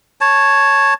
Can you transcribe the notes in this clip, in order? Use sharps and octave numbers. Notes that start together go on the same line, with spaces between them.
C#5 A5